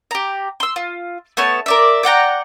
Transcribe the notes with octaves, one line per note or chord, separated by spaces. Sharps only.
G4 A#5
C6 E6
F4
A3 B3 C#5 A5
A#4 D5 E5
D5 F#5 G5 A#5